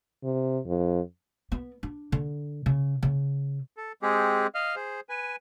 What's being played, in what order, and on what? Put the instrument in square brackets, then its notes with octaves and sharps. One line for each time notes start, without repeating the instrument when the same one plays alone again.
[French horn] C3
F2
[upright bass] B3
D4
D3
C#3
C#3
[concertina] A4
G#3 C4 G4 G#4
D#5 F5 F6
G#4 C5
B4 G#5